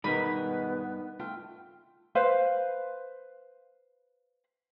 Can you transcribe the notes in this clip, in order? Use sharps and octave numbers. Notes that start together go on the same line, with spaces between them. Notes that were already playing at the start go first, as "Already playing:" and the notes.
G2 B2 D#3 G#3 B3 D#4 A#4 B5
A3 F4 G5
B4 C5 F5